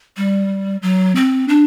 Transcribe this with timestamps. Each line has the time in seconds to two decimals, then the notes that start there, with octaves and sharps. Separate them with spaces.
0.17 G3
0.82 F#3
1.16 C4
1.49 D4